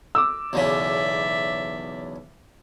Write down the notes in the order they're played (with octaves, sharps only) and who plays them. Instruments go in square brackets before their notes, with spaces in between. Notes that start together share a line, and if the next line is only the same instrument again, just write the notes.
[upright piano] D6 E6
[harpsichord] B1 E2 C#3 [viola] D5 E5